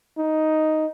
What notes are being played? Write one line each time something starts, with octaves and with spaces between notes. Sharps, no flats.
D#4